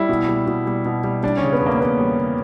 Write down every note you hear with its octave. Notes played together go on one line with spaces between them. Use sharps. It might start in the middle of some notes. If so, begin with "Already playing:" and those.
Already playing: G3 E4
B2
G3
B2
G3
B2
G3
G3 D4
C#4
C#3
B3
E2
A#3
E2 B3
G3
C#3